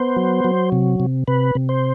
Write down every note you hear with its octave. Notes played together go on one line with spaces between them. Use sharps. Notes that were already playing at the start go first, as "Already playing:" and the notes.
Already playing: B3 C5
F#3
F#3
C3
C3
C3 B4
C3
C5